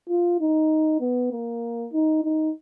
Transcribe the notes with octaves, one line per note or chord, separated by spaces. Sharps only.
F4
D#4
B3
A#3
D#4
D#4